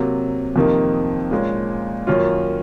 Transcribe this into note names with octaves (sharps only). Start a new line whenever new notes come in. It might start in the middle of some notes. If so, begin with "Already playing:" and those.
Already playing: C3 F#3 A#3
F2 C3 D#3 A#3 D#4
A#2 G#3 C#4
F#2 D#3 A#3 C#4 F4